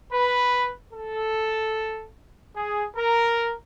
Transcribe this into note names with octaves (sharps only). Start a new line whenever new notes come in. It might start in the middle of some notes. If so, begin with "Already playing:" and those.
B4
A4
G#4
A#4